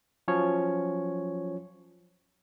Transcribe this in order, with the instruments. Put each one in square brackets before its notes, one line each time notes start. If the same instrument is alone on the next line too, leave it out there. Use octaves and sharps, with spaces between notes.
[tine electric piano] F3 F#3 C#4 C#5